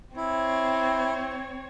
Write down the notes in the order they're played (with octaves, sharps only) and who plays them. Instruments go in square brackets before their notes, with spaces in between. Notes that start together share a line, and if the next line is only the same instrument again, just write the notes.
[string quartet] C4 C#5 [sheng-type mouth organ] E4